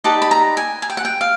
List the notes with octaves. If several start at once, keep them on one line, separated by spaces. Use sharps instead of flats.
D#4 G4 B4 D5 A5
B5
A#5
G#5
G#5
G5
F#5
G5
F5